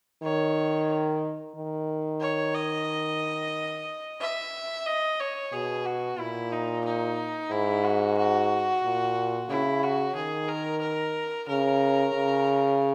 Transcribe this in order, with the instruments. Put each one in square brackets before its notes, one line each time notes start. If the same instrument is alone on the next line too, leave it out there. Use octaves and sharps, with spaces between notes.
[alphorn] D#3 [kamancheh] C#5
[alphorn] D#3
[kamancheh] C#5
D#5
E5
D#5
C#5
[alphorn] B2 [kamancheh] G#4
[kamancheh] F#4
[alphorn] A#2 [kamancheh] E4
[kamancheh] D#4
D#4
[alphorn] G#2 [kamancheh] E4
[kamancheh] F#4
F#4
[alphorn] A#2
[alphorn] C#3 [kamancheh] E4
[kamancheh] F#4
[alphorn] D#3 [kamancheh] G#4
[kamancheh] A#4
A#4
[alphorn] C#3 [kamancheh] A#4
[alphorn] C#3